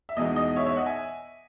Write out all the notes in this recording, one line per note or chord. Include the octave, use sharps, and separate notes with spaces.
E5
E2 B2 G#3 D#4 D#5
D#5
C#5 E5
C#5 E5
D#5 F#5
E5 G#5